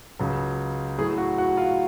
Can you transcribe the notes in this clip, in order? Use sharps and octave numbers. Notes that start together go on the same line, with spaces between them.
C#2 C#3 F#3
A2 F#3 G#4
F#4
F#4
F4